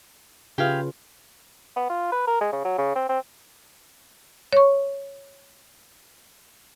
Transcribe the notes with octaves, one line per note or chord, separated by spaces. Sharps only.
C#3 F4 G4 G#4 B4 F5
B3
F4
B4
A#4
G#3
C#3
F#3
C#3
C4
C4
C#5 C#6